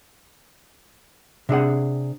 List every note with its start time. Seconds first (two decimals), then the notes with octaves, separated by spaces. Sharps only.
1.49 C3 D4 G#4 F#5